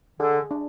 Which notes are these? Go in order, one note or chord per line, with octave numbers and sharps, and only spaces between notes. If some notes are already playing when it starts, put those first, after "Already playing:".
D3 G#4
D4